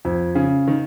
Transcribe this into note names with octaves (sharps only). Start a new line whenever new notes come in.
F2
C#3
D#3